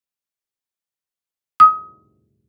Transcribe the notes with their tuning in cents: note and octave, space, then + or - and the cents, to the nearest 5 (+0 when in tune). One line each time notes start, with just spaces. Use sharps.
D#6 +25